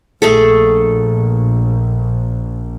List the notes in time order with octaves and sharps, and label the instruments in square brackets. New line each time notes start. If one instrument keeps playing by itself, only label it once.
[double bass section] A#1 [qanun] A3 G#4 A4